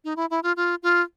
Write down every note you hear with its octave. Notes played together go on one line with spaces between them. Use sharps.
D#4
E4
E4
F4
F4
F4